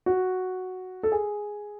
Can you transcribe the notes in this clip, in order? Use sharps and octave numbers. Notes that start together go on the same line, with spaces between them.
F#4
A4
G#4